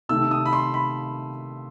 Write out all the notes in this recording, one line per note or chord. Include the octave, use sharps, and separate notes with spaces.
C3 D#3 A3 E6
D#6
B5
C6
B5